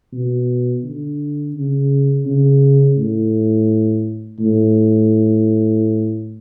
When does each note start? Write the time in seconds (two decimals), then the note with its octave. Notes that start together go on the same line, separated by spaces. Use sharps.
0.13 B2
0.84 D3
1.55 C#3
2.26 C#3
2.97 A2
4.40 A2